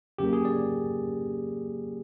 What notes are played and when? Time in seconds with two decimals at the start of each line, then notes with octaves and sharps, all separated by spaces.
0.18 C#3 F#3 A#3 G4
0.33 G#4
0.45 D5